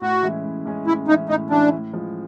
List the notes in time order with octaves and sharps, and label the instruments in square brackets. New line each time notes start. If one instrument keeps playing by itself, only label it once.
[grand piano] A2 [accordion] F#4
[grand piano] E3 G#3 C#4 E4
A2
E3 G#3 C#4 E4
[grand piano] A2 [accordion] E4
[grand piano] E3 G#3 C#4 E4 [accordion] D#4
[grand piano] A2 [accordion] D#4
[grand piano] E3 G#3 C#4 E4 [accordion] D4
[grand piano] A2
F3 G#3